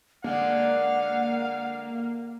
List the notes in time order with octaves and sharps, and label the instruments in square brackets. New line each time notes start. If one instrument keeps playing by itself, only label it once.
[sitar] D3 G#3 [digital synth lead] A#3 [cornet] F5 [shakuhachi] F#5